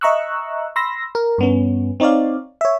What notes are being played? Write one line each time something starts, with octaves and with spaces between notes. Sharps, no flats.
D#5 E5 A#5 C#6 E6 F#6
B5 C6 E6 A#6
A#4
G2 B3 C#4
C4 D#4 C#5 D5 F5
C#5 E5